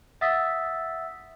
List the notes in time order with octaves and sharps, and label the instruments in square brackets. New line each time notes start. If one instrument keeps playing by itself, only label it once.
[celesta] E5 F#5 D#6 E6 A6 B6